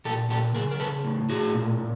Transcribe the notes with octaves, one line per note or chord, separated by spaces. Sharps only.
A#2 G4 A4
A#2 G4 A4
C#3 G#4 A#4
A#4
C#3 A4 B4
A2
A2 F#4 G#4
A#2
A#2